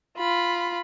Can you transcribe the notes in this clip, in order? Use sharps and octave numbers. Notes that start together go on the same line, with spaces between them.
F4 B5